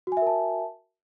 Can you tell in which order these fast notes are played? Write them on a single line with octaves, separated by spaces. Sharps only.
F#4 G#5 E5 A#4 A5